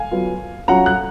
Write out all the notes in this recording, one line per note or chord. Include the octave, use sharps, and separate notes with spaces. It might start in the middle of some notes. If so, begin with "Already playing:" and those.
Already playing: F5 G#5
F#3 B3 F4
F#3 C#4 F4 F#5 A#5
F#6